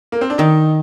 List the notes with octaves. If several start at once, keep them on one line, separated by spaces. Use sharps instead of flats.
A#3
C4
D4
D#3 D#4